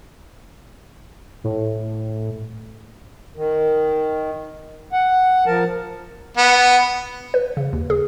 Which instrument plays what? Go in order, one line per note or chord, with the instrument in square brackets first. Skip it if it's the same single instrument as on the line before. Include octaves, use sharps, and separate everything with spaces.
[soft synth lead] A2
[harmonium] D#3
F#5
F3 A#4 A5
[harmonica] B3
[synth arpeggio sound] B4
C#3
D#2
G#4